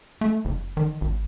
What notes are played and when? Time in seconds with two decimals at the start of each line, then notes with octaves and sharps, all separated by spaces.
0.21 A3
0.45 F#1
0.77 D#3
1.01 G#1